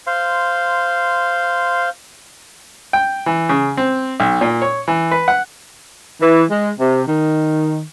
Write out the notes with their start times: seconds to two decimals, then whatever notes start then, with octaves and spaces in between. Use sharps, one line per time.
0.07 C5 F5 C6
2.93 G5
3.26 E3
3.49 C#3
3.77 C4
4.20 B1
4.41 A#2
4.62 C#5
4.88 E3
5.11 B4
5.28 F#5
6.21 E3
6.51 G#3
6.79 C3
7.07 D#3